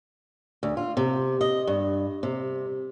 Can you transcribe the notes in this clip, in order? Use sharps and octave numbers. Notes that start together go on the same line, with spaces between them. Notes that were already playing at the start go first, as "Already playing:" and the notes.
D2
F4
C3
D#5
G2
C3